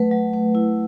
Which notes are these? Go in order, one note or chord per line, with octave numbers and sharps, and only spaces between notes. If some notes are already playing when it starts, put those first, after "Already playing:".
Already playing: F#3 A3 B4
F#3
A3
E4